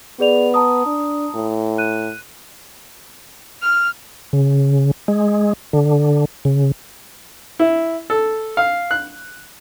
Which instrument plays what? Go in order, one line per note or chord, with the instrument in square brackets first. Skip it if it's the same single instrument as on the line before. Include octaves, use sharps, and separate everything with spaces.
[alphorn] B3 [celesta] G#4 D5 F7
[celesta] A5 A#5 D#6
[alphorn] D4
A2
[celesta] F#6 D#7
[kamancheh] F6
[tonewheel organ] C#3
G#3
D3
C#3
[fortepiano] E4
A4
F5
F#6